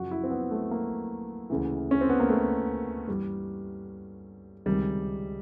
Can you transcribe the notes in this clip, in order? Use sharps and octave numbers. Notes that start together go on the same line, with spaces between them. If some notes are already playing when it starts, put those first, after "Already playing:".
Already playing: F#2 C#3 F3 F#4
E4
C4
B3
A3
A#3
D2 C#3 E3
C#4
C4
B3
A#3
A3
G2 E3 G3
C#2 C3 D#3 G3